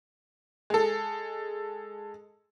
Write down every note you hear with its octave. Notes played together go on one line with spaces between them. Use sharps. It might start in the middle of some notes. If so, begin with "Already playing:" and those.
G#3 A4